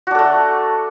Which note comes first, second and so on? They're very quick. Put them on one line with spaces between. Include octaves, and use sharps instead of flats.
F#4 D4 A4 A3